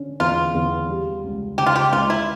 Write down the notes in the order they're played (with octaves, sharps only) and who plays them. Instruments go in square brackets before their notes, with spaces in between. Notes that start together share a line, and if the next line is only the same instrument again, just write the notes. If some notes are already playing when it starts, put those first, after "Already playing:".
Already playing: [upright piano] D3 C#4
[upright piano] E2 [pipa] F4
[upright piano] E2
G3
C#2
[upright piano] C#3 [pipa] G4
[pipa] F4
G4
[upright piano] C#2 [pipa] F4
[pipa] E4